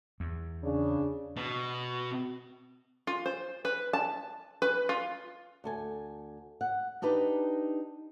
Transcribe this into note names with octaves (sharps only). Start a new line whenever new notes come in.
E2
C#3 D4
B2
F4
C5
B4
A5
B4
F4
D2 A4 G#5
F#5
D4 D#4 G4 B4 D#5